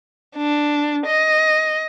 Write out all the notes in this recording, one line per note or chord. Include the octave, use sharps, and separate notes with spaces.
D4
D#5